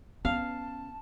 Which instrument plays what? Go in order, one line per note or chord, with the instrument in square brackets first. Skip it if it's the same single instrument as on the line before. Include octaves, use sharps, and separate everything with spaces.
[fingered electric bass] B3 [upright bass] C#4 [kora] F5 [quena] A5